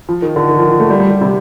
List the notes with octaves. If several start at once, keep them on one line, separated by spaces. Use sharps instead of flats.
F3
D#3
D3
D#3
F3
F3
A3
G3
G3
G3
C3